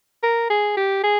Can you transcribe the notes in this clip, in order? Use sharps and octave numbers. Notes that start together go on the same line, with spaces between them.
A#4
G#4
G4
G#4